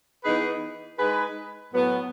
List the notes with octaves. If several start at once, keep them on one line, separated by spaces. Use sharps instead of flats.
E3 B3 D#4 G#4 B4
G#3 D#4 G#4 B4
A2 F#3 B3